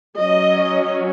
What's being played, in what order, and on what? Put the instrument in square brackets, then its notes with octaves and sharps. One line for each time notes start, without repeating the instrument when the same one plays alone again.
[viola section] F#3 C#4 D#5